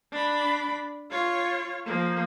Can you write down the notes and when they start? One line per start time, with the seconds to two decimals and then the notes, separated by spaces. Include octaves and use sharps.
0.12 D4 B5
1.11 F4 C#5
1.86 F3 A#3